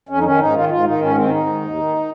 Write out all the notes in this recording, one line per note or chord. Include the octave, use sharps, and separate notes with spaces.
F2 C#4
D#4
D#3 C#4
G#2 D#4
D#3 F4
G#2 F4
D#3 D#4
G#2 C#4
D#3 C4
G#2 D#4
D#3
D#2
D#3